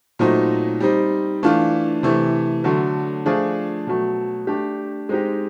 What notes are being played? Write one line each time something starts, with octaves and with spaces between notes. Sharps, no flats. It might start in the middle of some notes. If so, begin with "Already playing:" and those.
A#2 F#3 A3 C4 D#4
G3 C4 D#4
E3 A3 D4 F4
C3 E3 A3
D3 F#3 A3
F3 A3 D4 F4 G#4
B2 F#3 A3
A3 D4 G4
G#3 C4 D#4 G4